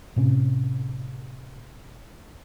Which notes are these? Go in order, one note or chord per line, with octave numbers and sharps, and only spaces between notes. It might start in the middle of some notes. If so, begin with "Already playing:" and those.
A2 C3 C#4